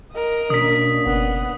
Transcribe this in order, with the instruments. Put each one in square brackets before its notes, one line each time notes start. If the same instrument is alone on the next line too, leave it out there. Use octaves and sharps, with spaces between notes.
[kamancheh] A#4 D#5
[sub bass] B2 [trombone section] A#3 C#4 D4 [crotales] D#6 B6
[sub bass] F#1 [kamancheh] B3